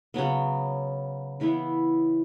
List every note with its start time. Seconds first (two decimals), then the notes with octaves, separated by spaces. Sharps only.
0.14 C#3 F#3 B3
1.40 C#3 E3 B3 E4